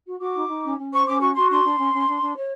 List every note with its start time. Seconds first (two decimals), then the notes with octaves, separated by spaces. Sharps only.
0.06 F#4
0.19 F#4 D6
0.34 D#4
0.49 D#4
0.63 C#4
0.78 C#4
0.92 C5 C#6
1.06 C#4 D6
1.20 F#4 C#6
1.34 F#4 C6
1.49 D4 C6
1.64 D4
1.78 C#4
1.92 C#4
2.06 D4
2.21 D4
2.35 C#5